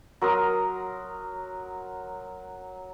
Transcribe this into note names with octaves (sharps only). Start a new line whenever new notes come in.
F#3 A#4 C6 D#6